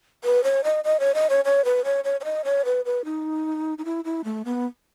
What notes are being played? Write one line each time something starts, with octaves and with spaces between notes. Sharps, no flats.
B4
C#5
D#5
D#5
C#5
D#5
C#5
C#5
B4
C#5
C#5
C#5
D#5
C#5
B4
B4
D#4
D#4
E4
E4
A3
B3